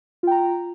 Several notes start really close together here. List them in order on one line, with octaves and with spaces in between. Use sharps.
F4 G5 A#5